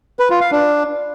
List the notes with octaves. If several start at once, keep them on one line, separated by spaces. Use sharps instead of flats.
B4
F4
F5
D4